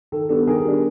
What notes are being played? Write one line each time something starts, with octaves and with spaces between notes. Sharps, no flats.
D#3 A4
G3 B3 D4 A4
D#3 G#4 A#4
G3 B3 D4